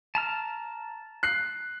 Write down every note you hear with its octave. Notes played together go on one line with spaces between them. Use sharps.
A5 A#5 F6
F#6 C7